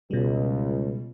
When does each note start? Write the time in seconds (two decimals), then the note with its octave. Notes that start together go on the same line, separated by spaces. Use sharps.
0.11 C#2 B2 G3